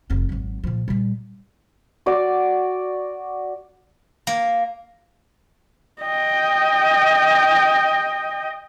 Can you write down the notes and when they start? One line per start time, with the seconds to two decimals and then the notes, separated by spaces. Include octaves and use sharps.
0.10 F1 E3
0.29 G#1 F#3
0.63 A#2 F3
0.88 A#2 G3
2.06 F#4 D5
4.27 A#3
6.02 D#5 G5